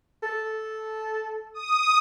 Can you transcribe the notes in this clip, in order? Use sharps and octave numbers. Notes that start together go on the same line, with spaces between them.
A4
D#6